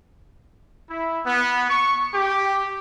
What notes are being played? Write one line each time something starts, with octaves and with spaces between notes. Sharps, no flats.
E4
B3
C#6
G4